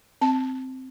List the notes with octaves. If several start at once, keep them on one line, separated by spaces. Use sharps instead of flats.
C4 A5